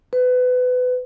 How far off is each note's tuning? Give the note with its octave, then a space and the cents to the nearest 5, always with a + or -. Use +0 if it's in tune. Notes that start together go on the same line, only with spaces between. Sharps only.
B4 +25